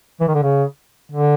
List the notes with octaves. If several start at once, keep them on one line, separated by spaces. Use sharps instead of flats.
E3
D#3
D3
C#3
D3